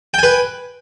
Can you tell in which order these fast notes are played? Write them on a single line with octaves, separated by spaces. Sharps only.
G5 G#5 B4